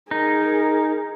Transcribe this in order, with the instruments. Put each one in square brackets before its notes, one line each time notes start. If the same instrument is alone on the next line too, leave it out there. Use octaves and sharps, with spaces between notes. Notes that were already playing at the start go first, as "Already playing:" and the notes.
[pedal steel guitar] D#4 [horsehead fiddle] G#4 A#4